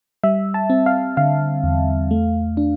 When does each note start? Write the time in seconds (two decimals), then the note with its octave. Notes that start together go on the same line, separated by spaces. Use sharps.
0.24 G3 E5
0.54 A5
0.70 C4
0.86 F5
1.17 D3 F5
1.64 E2
2.11 A3
2.57 D4